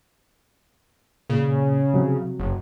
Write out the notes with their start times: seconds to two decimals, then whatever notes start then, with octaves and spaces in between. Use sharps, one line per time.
1.30 A#2 C#3
1.94 C3 F#3
2.39 F#1